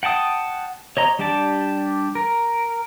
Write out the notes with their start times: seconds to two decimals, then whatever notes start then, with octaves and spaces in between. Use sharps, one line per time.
0.03 F#5 G5 A5 D#6
0.97 C#5 D#5 A#5
1.19 G3 D4 G4 D5 A5
2.15 A#4